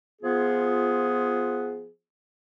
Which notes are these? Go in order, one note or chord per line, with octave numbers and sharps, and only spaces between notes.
F3 B3 F4 G#4